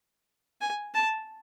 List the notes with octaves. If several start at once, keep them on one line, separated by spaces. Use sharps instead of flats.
G#5
A5